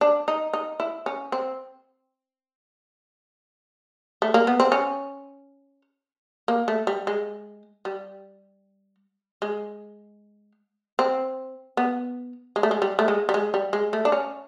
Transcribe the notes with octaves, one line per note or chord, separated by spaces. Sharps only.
D4
D#4
D#4
E4
C#4
C4
A3
A#3
B3
C4
C#4
A#3
A3
G3
G#3
G3
G#3
C4
B3
G#3
A3
G#3
G3
A3
G#3
G3
G#3
G3
G#3
A3
D4
C#4